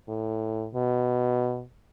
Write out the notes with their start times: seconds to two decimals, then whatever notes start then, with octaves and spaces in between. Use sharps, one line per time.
0.08 A2
0.74 B2